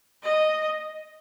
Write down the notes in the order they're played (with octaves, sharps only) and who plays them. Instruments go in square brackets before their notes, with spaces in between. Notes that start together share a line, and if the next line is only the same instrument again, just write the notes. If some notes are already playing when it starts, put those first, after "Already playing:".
[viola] D#5